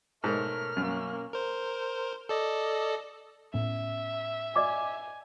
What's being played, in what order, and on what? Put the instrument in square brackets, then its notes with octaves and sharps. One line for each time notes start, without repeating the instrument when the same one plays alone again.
[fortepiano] G#2 [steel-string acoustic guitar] B2 A#4 C#5 [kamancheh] A3 [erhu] F6
[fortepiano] F#2 [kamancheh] A#3 C#4
[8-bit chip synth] A#4 C5
A4 D5 D#5
[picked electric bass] A2 B3 C#4 [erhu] E5
[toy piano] D5 D#5 D6 [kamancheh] G#5